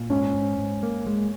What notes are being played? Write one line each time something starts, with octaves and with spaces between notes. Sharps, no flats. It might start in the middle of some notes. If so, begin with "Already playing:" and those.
Already playing: A#2
G#2 C#4
G#2
G#2
A#3
G#3